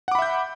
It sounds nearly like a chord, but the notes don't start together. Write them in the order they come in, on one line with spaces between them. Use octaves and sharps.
F#5 D6 B5 E5 G6